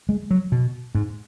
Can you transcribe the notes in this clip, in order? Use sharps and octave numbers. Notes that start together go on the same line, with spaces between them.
G#3
F#3
B2
G#2